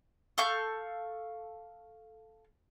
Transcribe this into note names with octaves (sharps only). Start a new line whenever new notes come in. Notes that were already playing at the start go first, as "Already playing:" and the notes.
A4 F5 C#6 G6